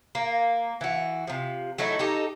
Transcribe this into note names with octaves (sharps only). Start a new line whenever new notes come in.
A#3
E3 F#4
C3 F3
F#3 A3 D#4 E4
D#4 G4 A4